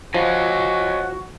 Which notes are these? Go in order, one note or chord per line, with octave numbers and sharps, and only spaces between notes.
F3 F#4 C#5 D#5 G#5